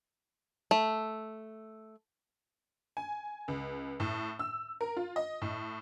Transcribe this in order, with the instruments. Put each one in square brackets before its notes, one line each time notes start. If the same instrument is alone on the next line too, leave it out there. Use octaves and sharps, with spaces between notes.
[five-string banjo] A3
[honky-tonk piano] G#5
C#2
A2
E6
A#4
F4
D#5
A2